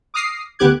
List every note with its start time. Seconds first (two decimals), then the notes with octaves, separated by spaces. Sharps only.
0.14 D6 D#6 F6 A#6 C7
0.59 D2 B3 G4 D6 F#6 G#6